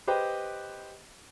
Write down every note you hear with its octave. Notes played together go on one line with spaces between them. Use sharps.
G4 B4 C5 D#5 G5